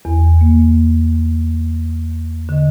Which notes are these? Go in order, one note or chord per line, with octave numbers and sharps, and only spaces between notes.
E2
A#3
D3 D#5